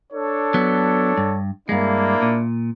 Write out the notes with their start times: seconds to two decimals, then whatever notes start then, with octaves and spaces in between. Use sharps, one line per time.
0.13 D4 A4 C#5
0.54 F#3 B3
1.18 G2
1.69 G2 G#3 A#3 D4 E4
2.22 A#2